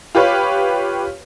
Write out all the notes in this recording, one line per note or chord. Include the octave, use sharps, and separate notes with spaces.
F4 G4 B4 C#5